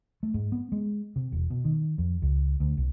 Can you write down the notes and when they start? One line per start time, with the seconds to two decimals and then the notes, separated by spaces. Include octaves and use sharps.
0.23 A3
0.34 G#2
0.52 B3
0.72 G#3
1.16 C3
1.32 E1
1.50 B2
1.64 D#3
1.98 F2
2.22 C#2
2.60 D2
2.77 C2